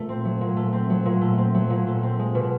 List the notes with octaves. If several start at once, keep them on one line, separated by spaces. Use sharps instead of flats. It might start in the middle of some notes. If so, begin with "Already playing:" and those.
Already playing: A#2 A3
C4
F#3
A#2
A3
C4
F#3
A#2
A3
C4
F#3
A#2
A3
C4
G#3
B2